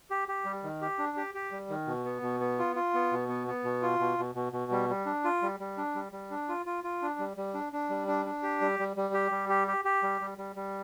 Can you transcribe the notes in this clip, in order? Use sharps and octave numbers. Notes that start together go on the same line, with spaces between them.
G4
G4
G3
D#3
G4
D4
G4
G4
G3
D#3
B2
B3
B2
B3
F4
F4
B3
B2
B3
B3
B2
F4
B2
B2
B2
B2
G3
G3
D4
F4
G3
G3
D4
G3
G3
D4
F4
F4
F4
D4
G3
G3
D4
D4
G3
D4
D4
G4
G3
G3
G3
G4
G3
G4
G4
G4
G3
G3
G3
G3